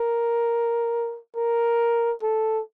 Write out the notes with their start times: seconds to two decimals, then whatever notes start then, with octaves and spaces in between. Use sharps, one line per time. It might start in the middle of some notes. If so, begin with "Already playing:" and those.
Already playing: A#4
1.36 A#4
2.23 A4